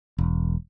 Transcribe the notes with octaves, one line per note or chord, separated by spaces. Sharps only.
E1